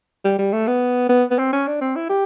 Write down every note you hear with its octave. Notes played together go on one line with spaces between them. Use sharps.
G3
G3
A3
B3
B3
B3
C4
C#4
D4
C4
E4
G4